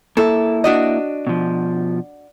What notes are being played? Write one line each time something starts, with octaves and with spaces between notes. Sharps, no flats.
A#3 E4 A4 E5
D4 F#4 D#5
B2 F3